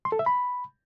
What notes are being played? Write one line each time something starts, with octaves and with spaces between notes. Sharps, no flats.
C6
A4
E5
B5